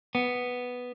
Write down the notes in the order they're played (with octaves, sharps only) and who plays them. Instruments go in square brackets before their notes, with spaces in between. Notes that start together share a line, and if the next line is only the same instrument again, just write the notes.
[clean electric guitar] B3